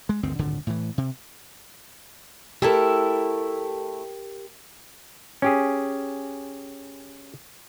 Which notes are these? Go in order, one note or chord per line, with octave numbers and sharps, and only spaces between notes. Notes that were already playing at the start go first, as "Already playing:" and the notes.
G#3
G1 D2 D#3 C4
D1 G#1 A#2 D3
A2 E3
C3
A3 E4 G4 A4 A#4
C#4 G4 G#4